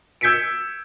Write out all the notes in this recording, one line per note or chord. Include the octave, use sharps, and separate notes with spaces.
E6 G6 G#6 B6 C#7 D7